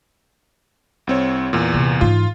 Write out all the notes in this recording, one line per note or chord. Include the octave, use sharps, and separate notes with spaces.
C2 C4 C#5
E2 A#2
C3
G#2 E3 F4